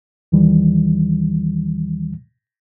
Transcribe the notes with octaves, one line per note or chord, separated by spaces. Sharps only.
D#2 D#3 E3 G3